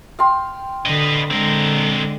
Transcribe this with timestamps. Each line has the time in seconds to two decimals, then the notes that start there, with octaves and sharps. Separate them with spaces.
0.19 F5 G5 C6
0.86 D3 B4 D#5
1.31 D3 G#3 C4 A#4